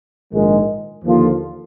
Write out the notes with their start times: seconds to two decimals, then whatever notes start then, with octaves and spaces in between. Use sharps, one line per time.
0.33 A#1 G#2 D#3 G#3
1.03 D#2 D3 F3 A#3 F4